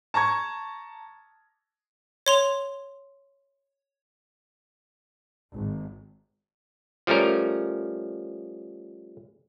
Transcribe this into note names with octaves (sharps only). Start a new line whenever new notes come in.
A5 A#5 C#6 G#6
C#5 C6 F7
G#1
F3 G3 A3 C#4 A#4